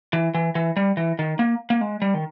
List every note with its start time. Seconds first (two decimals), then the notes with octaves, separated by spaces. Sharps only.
0.13 E3
0.34 E3
0.55 E3
0.77 G3
0.97 E3
1.19 D#3
1.39 A#3
1.70 A#3
1.81 G#3
2.02 G3
2.14 D#3